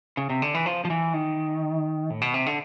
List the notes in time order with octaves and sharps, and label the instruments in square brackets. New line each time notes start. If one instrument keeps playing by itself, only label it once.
[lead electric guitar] C#3
C3
D3
E3
F3
F3
E3
D#3
A2
B2
C3
D3